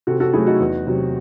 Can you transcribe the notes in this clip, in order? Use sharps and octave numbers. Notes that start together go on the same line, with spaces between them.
C3 F#4 A4
F#4 A4
F#3 A3 E4 G#4
D#4 F#4
E2
C3 F#3